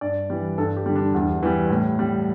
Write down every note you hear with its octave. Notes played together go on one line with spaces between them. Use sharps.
G2 D5
E3 G3
G2 A4
G4
D3 G3
D4
E2
E3 G3
A2
G3